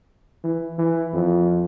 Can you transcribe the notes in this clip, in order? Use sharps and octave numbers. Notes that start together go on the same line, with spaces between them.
E3
E3
F2